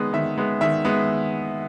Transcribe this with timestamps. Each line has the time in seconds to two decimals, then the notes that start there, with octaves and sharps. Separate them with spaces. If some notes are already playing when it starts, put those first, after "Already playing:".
Already playing: D#3 G#3 B3
0.13 D#3 E5
0.37 G#3 B3
0.61 D#3 E5
0.85 G#3 B3